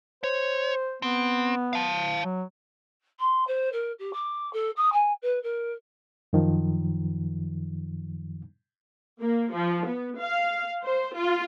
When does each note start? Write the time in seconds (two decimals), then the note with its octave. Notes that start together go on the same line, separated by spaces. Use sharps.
0.23 C5 C#5
1.02 B3 C4
1.73 F5 A5
2.24 F#3
3.19 C6
3.47 C5
3.72 A#4
3.99 G4
4.13 D6
4.53 A4
4.76 D#6
4.92 G#5
5.22 B4
5.43 A#4
6.33 F#2 D#3 F3
9.22 A#3
9.53 F3
9.87 B3
10.20 F5
10.84 C5
11.16 F4